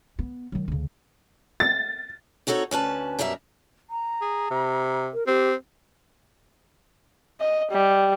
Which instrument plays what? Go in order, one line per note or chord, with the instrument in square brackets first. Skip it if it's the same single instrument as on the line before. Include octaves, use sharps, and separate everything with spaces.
[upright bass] B3
D#3 F#3
D2 C#3
[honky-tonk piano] A6
[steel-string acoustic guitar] C4 D#4 F#4 A4 C#5
D2 C#4 B4 A5
F#2 B2 G3 A#4 E5
[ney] A#5
[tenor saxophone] G#4
C3
[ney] A#4
[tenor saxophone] C4 [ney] G4
[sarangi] D#5
G3